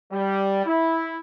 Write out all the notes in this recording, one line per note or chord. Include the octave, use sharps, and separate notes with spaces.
G3
E4